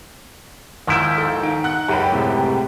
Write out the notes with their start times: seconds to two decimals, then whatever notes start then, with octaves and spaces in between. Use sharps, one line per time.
0.87 D#2 G#2 F3 E4 G6
1.18 A4
1.43 D#4 D7
1.64 F#5 F#6
1.88 C#2 F#2 G4 G5 B5
2.12 A2 C3 G#3